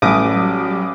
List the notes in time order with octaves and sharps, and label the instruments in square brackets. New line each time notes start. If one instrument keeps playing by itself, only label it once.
[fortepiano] A1 [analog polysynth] F#3 G3 [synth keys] D6 D#6